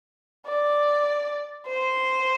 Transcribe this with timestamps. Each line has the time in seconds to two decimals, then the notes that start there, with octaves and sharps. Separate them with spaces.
0.46 D5
1.67 C5